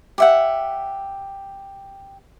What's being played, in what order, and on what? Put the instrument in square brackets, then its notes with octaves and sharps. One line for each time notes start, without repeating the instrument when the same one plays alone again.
[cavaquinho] G4 E5 F#5